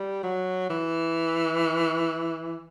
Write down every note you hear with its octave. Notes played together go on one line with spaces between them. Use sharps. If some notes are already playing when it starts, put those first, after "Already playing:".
Already playing: G3
F#3
E3